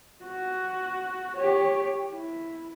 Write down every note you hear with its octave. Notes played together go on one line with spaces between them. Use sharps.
F#4
G4 C#5
E4